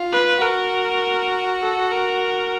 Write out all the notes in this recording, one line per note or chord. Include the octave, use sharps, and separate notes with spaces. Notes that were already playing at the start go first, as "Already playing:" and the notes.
Already playing: F4
B4
F#4 A#4
A4
A#4